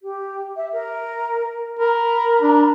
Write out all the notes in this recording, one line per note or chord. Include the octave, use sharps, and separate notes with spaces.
G4
E5
A#4
A#4 A#5 B5
D4